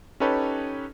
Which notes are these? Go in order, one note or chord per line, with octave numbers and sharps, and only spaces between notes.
C#4 D#4 G4 A4 B4 C#5